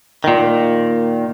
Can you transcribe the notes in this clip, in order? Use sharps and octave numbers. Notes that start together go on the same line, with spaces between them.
A#2 D#3